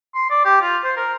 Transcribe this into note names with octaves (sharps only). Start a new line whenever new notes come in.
C6
D5
G4
F4
C5
A#4